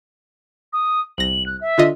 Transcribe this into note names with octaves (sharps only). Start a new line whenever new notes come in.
D#6
C2 A#6 F#7
F#6
E5
D3 F4 D#5